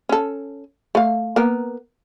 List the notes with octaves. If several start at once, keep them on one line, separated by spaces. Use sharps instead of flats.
C#4 A4
A3 F5
A#3 B3 A#4